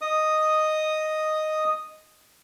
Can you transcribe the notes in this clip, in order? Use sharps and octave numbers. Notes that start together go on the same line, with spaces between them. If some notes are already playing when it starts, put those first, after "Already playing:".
D#5 D#6